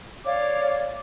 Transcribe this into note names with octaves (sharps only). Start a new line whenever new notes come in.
C#5 D5 F5 D6